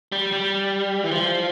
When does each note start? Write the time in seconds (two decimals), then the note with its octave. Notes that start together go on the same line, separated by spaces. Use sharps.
0.12 G3
0.32 G3
1.04 E3
1.12 F3